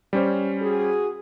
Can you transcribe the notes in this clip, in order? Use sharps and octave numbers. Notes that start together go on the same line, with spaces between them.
G3 C#4 C5
F#4 G#4